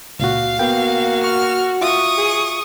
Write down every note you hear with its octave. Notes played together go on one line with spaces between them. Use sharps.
C#2 A#2 F#4 F5
A#3 B3 F#4 G5
C#6 F6
F4 E5 C#6 D#6
G#4